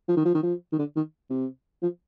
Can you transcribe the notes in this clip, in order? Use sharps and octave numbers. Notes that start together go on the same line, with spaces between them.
F3
D#3
F3
D#3
F3
D#3
D3
D#3
C3
F3